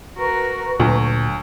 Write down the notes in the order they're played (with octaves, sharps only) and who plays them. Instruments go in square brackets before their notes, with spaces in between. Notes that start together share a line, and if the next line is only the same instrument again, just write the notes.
[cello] F#4 A#4 [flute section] B4 A#5 C#6
[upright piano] D2 [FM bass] A#2 [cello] F#3